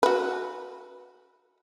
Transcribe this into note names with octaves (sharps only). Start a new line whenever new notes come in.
F#4 B4